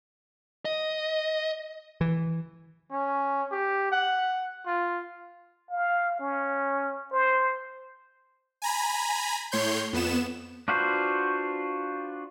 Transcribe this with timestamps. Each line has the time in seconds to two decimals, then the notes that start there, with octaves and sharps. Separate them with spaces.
0.65 D#5
2.01 E3
2.92 C#4
3.52 G4
3.92 F#5
4.67 F4
5.70 F5
6.20 C#4
7.12 C5
8.62 G#5 A#5 B5
9.52 A2 C#5 C6 G6
9.93 F2 B3 E7
10.68 D4 F4 F#4 B4 C5